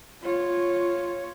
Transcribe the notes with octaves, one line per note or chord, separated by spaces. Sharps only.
F4 C#5